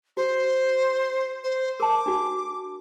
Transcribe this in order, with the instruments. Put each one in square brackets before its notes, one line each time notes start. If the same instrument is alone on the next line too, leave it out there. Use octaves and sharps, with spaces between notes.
[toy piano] F#4 [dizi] C5
[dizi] C5
[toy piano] A#4 A5 [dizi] D6
[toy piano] D4 F#4